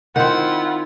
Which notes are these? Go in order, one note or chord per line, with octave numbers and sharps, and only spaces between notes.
D#3 C4 E4 F4 F#5